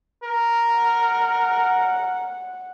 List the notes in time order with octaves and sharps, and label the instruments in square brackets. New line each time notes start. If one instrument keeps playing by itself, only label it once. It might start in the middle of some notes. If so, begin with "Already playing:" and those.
[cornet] A#4
[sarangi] F#5